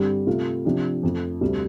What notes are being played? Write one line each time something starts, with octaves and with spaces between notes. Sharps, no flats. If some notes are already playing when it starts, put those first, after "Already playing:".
Already playing: G2 D3 G3 C4 G4
C3 A3 C4 F4
C3 F3 D4 G4
F2 F3 A3
D2 C3 G3